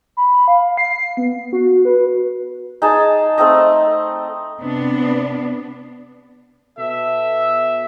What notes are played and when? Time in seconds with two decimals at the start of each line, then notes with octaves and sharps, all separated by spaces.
0.17 B5
0.48 F5
0.77 C7
1.17 B3
1.53 F#4
1.85 B4
2.82 D#4 G#4 A5
3.38 A3 C4 D#4 D#5
4.60 C3 B3 D4
6.78 B2 A4 E5